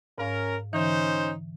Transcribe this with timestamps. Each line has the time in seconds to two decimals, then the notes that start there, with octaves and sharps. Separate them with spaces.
0.18 G#2 C#4 A#4 F5
0.73 D3 E3 C#4 D#4 C5